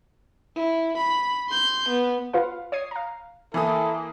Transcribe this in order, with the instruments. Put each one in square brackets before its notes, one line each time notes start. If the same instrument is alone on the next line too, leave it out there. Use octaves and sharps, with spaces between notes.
[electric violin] E4
B5
C6 G6
B3
[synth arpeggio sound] F4 B4 F5 F#5
C#5 D#6 G#6 C7
F5 A#5
[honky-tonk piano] E3 A#3 D#6 [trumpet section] E4 A4